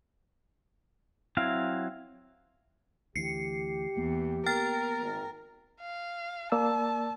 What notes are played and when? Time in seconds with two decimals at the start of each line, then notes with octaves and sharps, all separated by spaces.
1.37 F#3 C4 E4 F5
3.16 D2 E3 G4 C7 C#7
3.97 E2 A#3 B3
4.46 A#4 G5 F6 A6
5.00 G#1
5.81 F5
6.52 A#3 D5 A5 E6